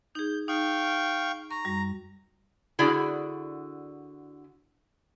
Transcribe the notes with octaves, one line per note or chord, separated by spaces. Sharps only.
D#4 G#4 G6
D#4 F5 G5 C#6
A#5 C#6
F#2 G3
D3 E4 F#4 G#4 D5